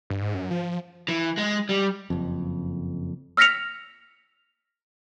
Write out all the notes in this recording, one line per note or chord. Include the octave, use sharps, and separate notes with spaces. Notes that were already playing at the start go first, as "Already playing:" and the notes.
G2
G#2
F#2
F3
F3
E3
G#3
G3
F#1 F2
E6 F6 A#6 B6 C#7 F7